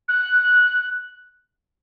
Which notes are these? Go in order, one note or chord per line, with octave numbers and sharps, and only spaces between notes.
F#6